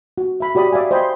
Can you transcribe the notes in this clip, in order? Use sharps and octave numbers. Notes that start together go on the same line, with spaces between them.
F#4
E5 B5
F#4 G4 D5 B5 D#6
D5 E5 F5 G#5
C5 D#5 G5 G#5 B5 C6